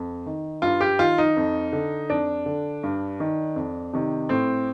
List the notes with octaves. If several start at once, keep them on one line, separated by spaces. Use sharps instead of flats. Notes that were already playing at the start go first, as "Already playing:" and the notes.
Already playing: F2
D#3
G2 F4
G4
D#3 F4
D#4
F2
D3
F2 D4
D3
G2
D#3
F2
C3 D#3
A2 C4